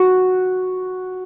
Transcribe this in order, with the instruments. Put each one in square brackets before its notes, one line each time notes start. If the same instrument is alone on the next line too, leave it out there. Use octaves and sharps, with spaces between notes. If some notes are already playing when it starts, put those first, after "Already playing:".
Already playing: [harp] F#4